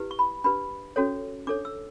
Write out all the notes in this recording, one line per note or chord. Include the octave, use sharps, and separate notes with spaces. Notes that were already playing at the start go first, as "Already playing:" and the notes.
Already playing: E4 G4 B4
C#6
B5
D4 G4 B4 B5
C#4 F#4 A4 C#5
D4 A4 C#5 D6
E6